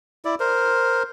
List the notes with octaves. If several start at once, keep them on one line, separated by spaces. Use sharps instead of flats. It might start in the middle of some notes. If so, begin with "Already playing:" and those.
E4 D5
A#4 C5